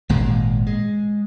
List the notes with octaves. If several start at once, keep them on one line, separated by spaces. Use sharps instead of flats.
G#1 A#2 G#3
G#3